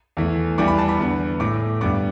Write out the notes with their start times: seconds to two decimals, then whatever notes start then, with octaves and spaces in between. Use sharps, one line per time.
0.17 E2 E3 A3
0.58 E2 E3 G3 B3 D6
0.68 B5
0.78 A5
0.89 B5
0.99 E2 D3 B3
1.40 A2 A3 D6
1.81 G2 G3 B3 D6